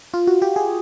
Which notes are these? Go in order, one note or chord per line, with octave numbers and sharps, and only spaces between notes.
F4
F#4
G4
G#4